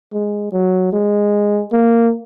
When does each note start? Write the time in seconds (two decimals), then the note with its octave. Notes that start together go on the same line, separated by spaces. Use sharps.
0.13 G#3
0.52 F#3
0.93 G#3
1.73 A#3